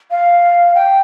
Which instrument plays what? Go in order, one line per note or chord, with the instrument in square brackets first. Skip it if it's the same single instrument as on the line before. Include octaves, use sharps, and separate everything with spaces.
[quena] F5
G5